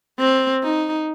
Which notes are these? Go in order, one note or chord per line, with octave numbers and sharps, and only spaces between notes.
C4
D#4